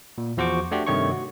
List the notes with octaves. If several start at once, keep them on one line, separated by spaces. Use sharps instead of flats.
A#2
E2 F3 F#4 C5 C#6 D6
A3 D4 F#4 G4
G2 C3 D#3 A3 C#5 C#6
F#4